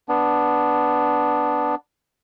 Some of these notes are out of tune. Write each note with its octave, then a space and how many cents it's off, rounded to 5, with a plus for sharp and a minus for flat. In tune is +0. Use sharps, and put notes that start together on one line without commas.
B3 +0 D4 +0